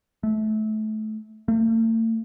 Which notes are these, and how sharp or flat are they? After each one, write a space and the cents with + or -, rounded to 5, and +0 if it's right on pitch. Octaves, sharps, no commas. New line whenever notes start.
A3 -25
A3 +45